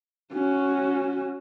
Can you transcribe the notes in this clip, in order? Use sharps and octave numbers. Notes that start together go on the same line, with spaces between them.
C#4 F#4